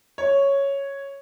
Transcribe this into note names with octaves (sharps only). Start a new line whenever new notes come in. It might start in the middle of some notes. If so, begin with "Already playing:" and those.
C#5